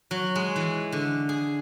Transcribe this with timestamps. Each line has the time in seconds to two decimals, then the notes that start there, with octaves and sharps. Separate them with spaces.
0.11 F#3
0.35 G#3
0.56 E3
0.92 D3
1.29 G#4